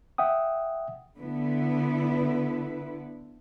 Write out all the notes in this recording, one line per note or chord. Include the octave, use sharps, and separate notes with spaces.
E5 F#5 G5 D#6
D3 B3 E4 B4